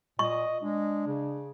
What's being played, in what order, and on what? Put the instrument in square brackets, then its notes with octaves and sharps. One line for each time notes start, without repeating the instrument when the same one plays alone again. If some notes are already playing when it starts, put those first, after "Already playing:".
[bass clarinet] A#2 [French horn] D#5 [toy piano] C#6
[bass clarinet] G#3 [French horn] D4
[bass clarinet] C#3